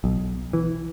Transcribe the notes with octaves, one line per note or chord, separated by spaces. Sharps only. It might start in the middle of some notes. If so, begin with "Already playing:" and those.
B1
E3